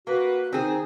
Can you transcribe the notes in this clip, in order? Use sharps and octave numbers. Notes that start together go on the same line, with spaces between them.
A#3 F#4 B4
D#3 C4 D#4 G#4